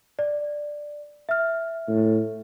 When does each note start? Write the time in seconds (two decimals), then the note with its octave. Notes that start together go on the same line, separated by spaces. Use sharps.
0.19 D5
1.29 E5 F6
1.88 A2